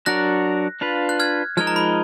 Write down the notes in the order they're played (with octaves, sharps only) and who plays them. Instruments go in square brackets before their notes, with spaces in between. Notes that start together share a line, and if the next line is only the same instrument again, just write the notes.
[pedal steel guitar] F#3 D4 F#4 A#4 [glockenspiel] F#6 A#6
[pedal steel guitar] D4 F4 B4 F5
[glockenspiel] F#6
F6 G#6
[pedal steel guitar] F3 G#3 D#4 A#4 D#5 [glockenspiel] F6 G#6
[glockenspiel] A#5
B5